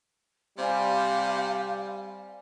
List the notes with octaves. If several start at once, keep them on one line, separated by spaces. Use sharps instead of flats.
C3 G3 C5 D5 F5 G#5